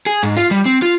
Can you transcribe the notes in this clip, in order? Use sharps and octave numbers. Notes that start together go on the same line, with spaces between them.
G#4
G#2
F4
G3
C4
F4